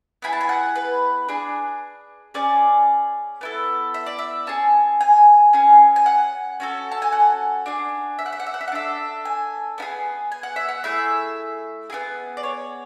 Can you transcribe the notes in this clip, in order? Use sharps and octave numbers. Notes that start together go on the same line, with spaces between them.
B3 E4 G#4 B5
A5
G#5
F#5
B4
D4 G#4
C#4 G#4 D5
B3 E4 A4
E5
D5
E5
C#4 G#4 A5
G#5
C#4 G#4
G#5
F#5
C#4 F#4 A4
A5
G#5
F#5
D4 G#4
E5
F#5
E5
F#5
E5
F#5
E5
F#5
D4 A4 E5
G#5
B3 E4 G#4
G#5
F#5
E5
F#5
A3 E4 G#4 E5
B3 E4 G#4
D5
C#5